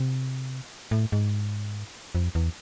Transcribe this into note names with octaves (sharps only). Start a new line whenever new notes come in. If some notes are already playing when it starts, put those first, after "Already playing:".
Already playing: C3
A2
G#2
F2
E2